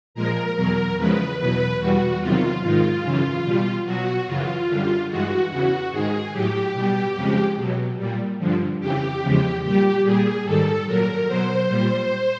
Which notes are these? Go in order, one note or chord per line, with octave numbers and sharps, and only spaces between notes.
A#2 F3 G#3 A#4
E2 B2 F#3 A#4
E2 C#3 F3 G#3 B4
E2 B2 F#3 B4
E2 B2 G3 F#4
E2 C3 D#3 F#3 F4
G#2 D#3 G#3 F4
F#2 C#3 E3
B2 G3
B2 F#3 F#4
F#2 C#3 E3 F4
F#2 D3 G3
G2 E3 G#3 F#4
E2 C#3 E3 F#4
G#2 D#3 G#3 G#4
A2 F#3 G4
B2 G3
F2 C#3 F3 G#3
B2 F#3
A#2 G3
G2 D3 F3
F2 C#3 E3 G4
E2 C#3 F3 G#3
A#2 G3 G4
A#2 G3 G#4
G#2 D#3 G3 A4
A#2 F#3 A#4
B2 F#3 C5
A#2 G3